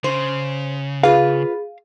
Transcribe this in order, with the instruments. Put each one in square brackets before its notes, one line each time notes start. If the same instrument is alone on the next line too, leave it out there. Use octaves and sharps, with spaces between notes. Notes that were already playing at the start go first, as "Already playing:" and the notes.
[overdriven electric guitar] C#3 [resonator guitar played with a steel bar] C5
[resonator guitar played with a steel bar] F4 B4 [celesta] G#4 [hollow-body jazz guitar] F5